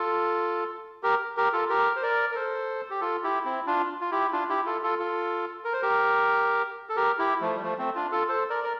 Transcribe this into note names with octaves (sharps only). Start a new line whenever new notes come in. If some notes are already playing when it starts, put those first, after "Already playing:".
Already playing: F4 A4
G4 A#4
G4 A#4
F4 A4
G4 A#4
C5
A#4 D5
A#4
A4 C5
G4
F4 A4
E4 G4
C4 E4
D4 F4
F4
E4 G4
D4 F4
E4 G4
F4 A4
F4 A4
F4 A4
A#4
C5
G4 A#4
A4
G4 A#4
E4 G4
F3 A3
G3
F3 A3
A3 C4
D4 F4
F4 A4
A4 C5
A#4 D5
A#4